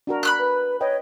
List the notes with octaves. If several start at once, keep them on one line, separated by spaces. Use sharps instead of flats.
D4 F#4 A#4
B5 F6 F#6
B4
B4 C#5 D#5 G5